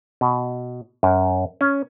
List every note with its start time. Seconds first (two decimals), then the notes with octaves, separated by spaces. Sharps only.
0.21 B2
1.03 F#2
1.61 C#4